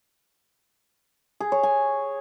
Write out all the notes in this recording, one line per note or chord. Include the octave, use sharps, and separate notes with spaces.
G#4
C#5
G#5